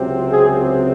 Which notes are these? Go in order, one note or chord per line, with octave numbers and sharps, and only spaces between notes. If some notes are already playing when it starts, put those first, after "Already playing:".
Already playing: C#2 C3 F#3 C4
G#4